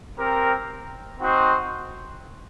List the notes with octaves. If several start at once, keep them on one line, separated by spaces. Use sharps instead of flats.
C4 G4 A#4
C4 D#4 F#4 C5